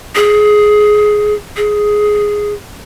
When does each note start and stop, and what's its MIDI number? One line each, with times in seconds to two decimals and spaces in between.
0.15 1.34 68
1.57 2.53 68